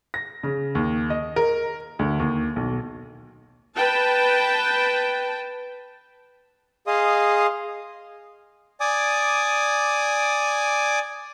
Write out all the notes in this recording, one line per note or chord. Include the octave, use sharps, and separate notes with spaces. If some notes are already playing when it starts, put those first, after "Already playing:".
A#6
C#3
D#2
D#5
A#4
D2
D#2
B1
B4 G5 A5
G#4 D#5 F5 C6 D#6
D5 G#5 D6 D#6